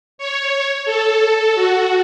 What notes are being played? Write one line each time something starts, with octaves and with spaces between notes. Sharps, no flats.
C#5
A4
F#4